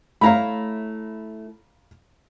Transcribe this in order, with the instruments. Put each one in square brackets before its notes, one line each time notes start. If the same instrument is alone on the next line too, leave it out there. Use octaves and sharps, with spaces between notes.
[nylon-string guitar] A3 E4 C#5 [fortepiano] F5 A#5 B5